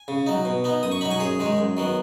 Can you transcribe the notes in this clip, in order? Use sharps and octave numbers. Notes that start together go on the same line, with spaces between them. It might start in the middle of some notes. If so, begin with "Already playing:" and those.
Already playing: G#5
C#3
F#3 D#4
B2
B3 D#4
F#2 D#6
C#6
F#3 D#4 B5
G#5 C#6
F#2 G#4 C#5
D#3 G#3 D#4
F#2
D#3 F#3 B3